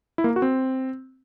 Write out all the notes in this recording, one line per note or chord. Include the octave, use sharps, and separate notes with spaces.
E4
A#3
A#4
F#4
C4